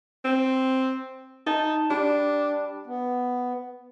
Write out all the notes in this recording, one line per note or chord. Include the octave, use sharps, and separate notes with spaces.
C4
D#4 A5
G3 D4
B3